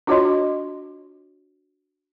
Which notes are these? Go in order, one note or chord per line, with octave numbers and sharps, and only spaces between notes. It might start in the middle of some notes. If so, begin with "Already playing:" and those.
D4 F4 F#4 C#5 D#5 C6